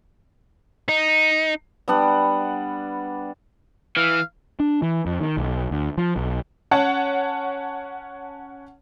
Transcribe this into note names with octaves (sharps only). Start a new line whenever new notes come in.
D#4
G3 B3 D4 F#5
E3 F5
D4
E3
F2
D#3
B1
D2
F3
B1
C#4 C#5 F#5 A5